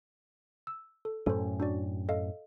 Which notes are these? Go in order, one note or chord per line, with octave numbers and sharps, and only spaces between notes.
E6
A4
F#2 A2 C#4 A4 C5
D4 F#4 D5
A4 D#5 F5